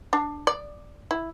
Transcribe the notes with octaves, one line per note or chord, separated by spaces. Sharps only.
D4
D5
E4